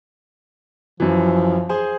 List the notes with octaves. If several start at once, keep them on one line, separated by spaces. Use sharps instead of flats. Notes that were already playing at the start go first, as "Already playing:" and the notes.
F#2 E3 F3
G#4 C5 G#5